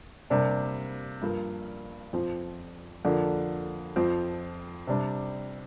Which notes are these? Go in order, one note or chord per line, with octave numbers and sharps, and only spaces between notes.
C3 G3 A#3 D4
G2 F3 A#3
F2 F3 C4
F2 D3 A#3 D4
F2 F3 C4
C3 G3 D4